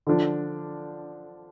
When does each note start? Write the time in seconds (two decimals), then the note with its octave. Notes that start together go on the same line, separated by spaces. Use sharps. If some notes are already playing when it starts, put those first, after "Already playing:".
0.07 D3 F3 D4